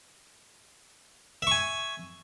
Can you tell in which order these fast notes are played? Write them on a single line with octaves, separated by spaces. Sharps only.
E5 C#6 G#5